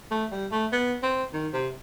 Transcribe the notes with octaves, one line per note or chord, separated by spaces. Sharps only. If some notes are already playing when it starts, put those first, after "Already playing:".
A3
G3
A3
B3
C4
D#3
C3